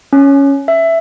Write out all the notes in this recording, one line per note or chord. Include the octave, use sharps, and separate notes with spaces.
C#4
E5